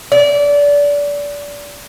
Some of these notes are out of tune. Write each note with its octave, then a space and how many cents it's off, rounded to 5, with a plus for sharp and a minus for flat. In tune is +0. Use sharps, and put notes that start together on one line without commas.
D5 -25